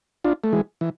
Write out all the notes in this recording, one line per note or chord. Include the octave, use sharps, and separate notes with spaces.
D4 F4
A3
E3 G#3
E3